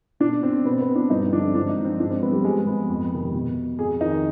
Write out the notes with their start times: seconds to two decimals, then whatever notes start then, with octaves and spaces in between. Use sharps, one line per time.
0.20 B2 D4
0.43 C4
0.65 B2 B3
0.73 C4
0.80 B3
0.95 D4
1.10 G2 D#4
1.26 C4
1.32 D3 F3 D4
1.54 G#2 D4
1.69 D#4
1.78 F3
1.85 C4
2.00 G#2 D4
2.10 C4
2.22 F3 B3
2.33 G3
2.44 G#2 G#3
2.67 F3 B3
2.89 F2
3.12 C3 D#3
3.34 B2
3.78 F2 G#4
4.01 D#3 D#4